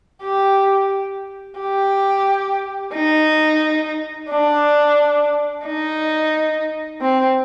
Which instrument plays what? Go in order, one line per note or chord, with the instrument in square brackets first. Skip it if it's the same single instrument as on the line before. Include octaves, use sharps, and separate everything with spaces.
[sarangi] G4
G4
D#4
D4
D#4
C4